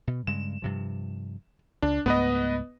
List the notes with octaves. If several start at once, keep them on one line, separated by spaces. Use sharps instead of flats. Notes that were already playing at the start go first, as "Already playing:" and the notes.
B2
G2 C#3 G#3 E7
G2 C3 F3
C#2 D4
C#2 G#2 A3 B3 B4 D#5